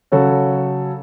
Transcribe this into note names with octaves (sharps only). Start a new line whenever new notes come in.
C#3 F#3 C#4 F#4 A4